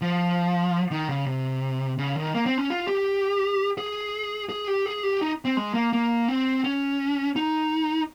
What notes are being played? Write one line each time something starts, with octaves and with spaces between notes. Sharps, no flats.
F3
D#3
C#3
C3
C#3
D#3
A#3
C4
C#4
F4
G4
G#4
G#4
G4
G#4
G4
D#4
C4
G#3
A#3
A#3
C4
C#4
D#4